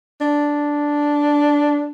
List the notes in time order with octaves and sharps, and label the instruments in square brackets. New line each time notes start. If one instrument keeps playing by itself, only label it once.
[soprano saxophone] D4